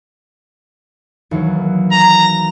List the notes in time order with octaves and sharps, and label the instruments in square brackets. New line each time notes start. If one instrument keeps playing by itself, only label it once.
[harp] D#2 E3 F#3
[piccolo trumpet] A#5